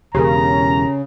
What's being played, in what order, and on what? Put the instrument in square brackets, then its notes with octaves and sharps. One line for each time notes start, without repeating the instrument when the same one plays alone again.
[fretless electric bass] E1 E2 [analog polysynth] C#3 [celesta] G4 A#4 [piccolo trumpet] A#5